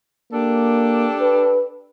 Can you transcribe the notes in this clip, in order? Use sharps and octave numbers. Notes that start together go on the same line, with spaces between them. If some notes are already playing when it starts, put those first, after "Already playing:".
A#3 D4 G4 A4
B4